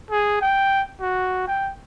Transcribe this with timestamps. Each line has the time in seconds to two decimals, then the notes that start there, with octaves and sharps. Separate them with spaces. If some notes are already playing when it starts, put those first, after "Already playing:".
0.10 G#4
0.41 G5
1.01 F#4
1.47 G5